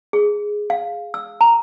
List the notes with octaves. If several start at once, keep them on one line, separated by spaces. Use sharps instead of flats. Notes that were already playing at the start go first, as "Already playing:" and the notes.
G#4
F5
E6
A#5